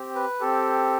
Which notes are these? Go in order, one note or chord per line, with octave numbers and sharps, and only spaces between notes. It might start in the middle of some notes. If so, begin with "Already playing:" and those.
Already playing: C4 G4
B4
C4 G4 A4